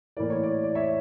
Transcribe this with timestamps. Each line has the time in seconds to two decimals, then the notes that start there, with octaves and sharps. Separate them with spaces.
0.17 A2 E3 A#3 E4 D5
0.30 C#5
0.43 D5
0.64 D5
0.75 C#5 E5